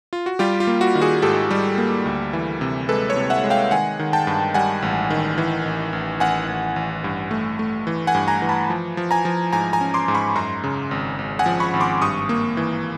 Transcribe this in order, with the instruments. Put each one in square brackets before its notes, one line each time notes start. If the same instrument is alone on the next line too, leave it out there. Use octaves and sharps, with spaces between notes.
[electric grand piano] F4
F#4
G3 F4 G4
F4
A#3
F#4
D#3
F#4 G#4
G#2 G4 A4
G3
A#3
D2
E3
C3
G#3 A4 B4
B4 C#5
C3
E5 F#5
G#3
F5 G5
D#3 F#5 G#5
D#3
G5 A5
G2
G3 F#5 G#5
A1
D#3
E3
A1
A1
A1 F#5 G#5
A1
A1
G2
A3
A3
E3
F#5 G#5
G2
G#5 A#5
E3
A5 B5
F3
F3
G#5 A#5
F3
G#2 G#5 A#5
G#5 A#5
C#4
C6 D6
G#2
B5 C#6
F#2 A#5 C6
C#3
G#1
G#1
F#5 G#5
F3
B5 C#6
G#1
C6 D6
G2 C#6 D#6
A#3
E3